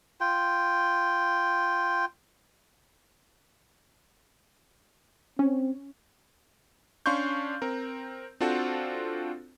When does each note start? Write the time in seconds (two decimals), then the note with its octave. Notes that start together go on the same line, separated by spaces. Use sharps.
0.20 F4 G5
5.39 C4 C#4
7.06 C#4 D4 F5 C6 C#6 G6
7.62 C4 A#4
8.41 C4 D4 F4 F#4 A4 C5